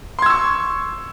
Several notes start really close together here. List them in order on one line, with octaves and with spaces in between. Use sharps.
C6 G#6 E6 C#6